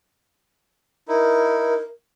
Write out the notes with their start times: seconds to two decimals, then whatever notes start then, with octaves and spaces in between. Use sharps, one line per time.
1.08 D#4 E4 A#4